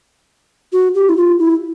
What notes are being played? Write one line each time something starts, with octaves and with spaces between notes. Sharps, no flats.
F#4
G4
E4
F4
E4